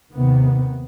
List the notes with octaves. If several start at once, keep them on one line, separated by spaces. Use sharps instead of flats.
D#2 C3 D#3 B3